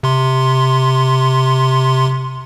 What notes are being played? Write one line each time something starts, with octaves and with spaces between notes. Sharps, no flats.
C3 C6